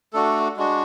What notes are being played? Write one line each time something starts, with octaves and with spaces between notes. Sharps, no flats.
A3 D4 F#4 A4
G#3 D4 F#4